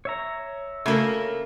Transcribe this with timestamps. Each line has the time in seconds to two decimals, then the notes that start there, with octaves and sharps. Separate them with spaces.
0.05 C#5 E5 A#5
0.86 C#3 A3 A#3 A#4